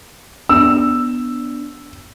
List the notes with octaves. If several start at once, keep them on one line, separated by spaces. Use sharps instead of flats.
B3 D4 E6